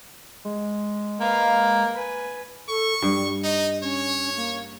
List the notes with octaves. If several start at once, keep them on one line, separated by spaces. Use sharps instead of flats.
G#3
A#3 B4 F5
B4 G#5
A4 C#6
G2 G3
D#4 D#5
C#4 C#5
A#3